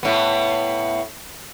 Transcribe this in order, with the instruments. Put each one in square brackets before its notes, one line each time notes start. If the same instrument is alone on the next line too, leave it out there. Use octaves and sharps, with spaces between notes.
[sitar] A2 B3